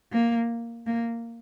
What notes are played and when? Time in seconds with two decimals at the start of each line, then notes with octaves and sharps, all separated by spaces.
0.12 A#3
0.87 A#3